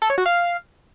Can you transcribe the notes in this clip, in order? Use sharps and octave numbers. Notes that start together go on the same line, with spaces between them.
A4
C#5
F#4
F5